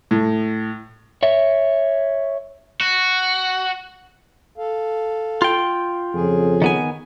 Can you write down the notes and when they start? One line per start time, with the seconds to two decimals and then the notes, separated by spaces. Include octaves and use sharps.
0.11 A2
1.23 C#5 E5
2.81 F#4
4.58 A4 F5
5.42 F4 G5
6.14 F2 C#3 G#4
6.62 D#3 B3 G#5